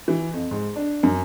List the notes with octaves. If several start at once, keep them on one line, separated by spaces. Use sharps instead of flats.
E3
F2
G#2
D4
F#2